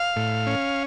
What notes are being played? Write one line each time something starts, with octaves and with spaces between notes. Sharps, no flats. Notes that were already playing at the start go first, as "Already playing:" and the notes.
Already playing: F5
A2
C#4